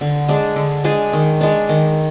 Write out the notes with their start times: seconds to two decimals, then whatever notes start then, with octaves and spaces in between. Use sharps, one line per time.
0.01 D3
0.29 G#3 D4 G#4
0.56 D3
0.84 G#3 D4 G#4
1.13 D#3
1.41 G#3 D4
1.69 D#3